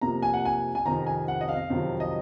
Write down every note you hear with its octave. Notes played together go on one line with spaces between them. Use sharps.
F2 C3 F3 A#3 A#5
G#5
F#5
G#5
G#5
F2 C3 D#3 A#5
G#5
F#5
D#5
F5
F2 C3 D#3 F#3
D#5